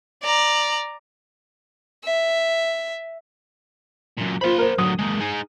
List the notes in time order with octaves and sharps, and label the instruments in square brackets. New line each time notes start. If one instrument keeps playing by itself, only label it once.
[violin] D5 A#5
[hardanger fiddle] E5
[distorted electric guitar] F#2 A#2
[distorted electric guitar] A#3 B5 [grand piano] F4 C5
[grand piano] A#4 C5
[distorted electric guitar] D3 F#3 [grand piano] D#6
[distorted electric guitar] G#3 A#3
D#4 G#4